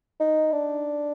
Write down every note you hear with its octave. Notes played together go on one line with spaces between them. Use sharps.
D#4
D4